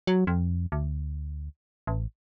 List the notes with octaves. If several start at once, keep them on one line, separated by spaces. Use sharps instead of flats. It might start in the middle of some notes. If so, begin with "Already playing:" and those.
F#3
F2
D2
A1